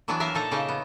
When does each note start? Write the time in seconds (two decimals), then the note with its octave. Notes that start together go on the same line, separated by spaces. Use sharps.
0.08 E3 F#3 B3 D4 E4
0.20 A#4 E5 F5 G#5
0.34 A#2 D#4 A4 E5 A#5
0.51 C#3 A#3 D#4 D#5 E5
0.68 B3